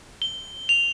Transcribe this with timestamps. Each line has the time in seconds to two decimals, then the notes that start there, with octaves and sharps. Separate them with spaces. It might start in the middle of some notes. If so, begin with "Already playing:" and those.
0.22 G7
0.69 F7